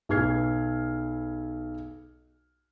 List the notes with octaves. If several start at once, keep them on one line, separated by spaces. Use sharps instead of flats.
B1 G#4 B4 F6 G#6 C7